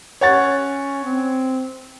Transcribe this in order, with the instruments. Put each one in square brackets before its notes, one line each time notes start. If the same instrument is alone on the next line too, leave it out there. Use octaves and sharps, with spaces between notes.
[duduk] C#4 [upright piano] C#5 F#5 A6
[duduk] C4